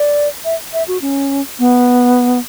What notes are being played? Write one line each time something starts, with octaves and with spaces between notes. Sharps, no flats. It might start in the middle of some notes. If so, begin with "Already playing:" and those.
Already playing: D5
E5
E5
F#4
C#4
B3